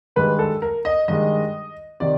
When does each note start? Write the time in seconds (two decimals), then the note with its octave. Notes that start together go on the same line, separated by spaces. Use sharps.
0.16 G2 D#3 G#3 B4
0.39 A4
0.62 A#4
0.85 D#5
1.08 G2 D#3 G#3 D#5
2.00 C3 D#3 D5